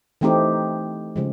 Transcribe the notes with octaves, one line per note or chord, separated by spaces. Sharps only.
E3 A3 C4 D#4 G4
C#3 F3 G#3